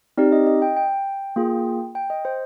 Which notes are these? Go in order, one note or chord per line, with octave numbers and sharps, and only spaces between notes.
C4 D#4 G4 D5
D#5
D#5
G5
G5
A#3 F4 G#4
G5
D#5
C5